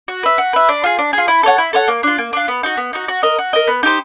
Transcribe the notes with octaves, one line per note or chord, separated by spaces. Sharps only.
F#4
B4 E5
F#4
B4 E5
D4
F4 G#4
D4
F4 G#4
E4
A4 C#5 F#5
E4
A4 C#5 F#5
A#3
D4 F4
A#3
D4 F4
B3
D#4 F#4
B3
D#4 F#4
F#4
A#4 D#5
F#4
A#4 D#5
B3
D#4 G4 C5